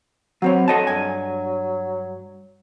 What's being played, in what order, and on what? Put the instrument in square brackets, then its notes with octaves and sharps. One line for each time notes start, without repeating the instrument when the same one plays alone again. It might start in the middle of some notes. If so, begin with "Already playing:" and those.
[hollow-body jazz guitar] F#3 C4 C#5 [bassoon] F#4
[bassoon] F#3 [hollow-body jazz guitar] A4 D#5 A5
[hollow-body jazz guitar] G2 G#5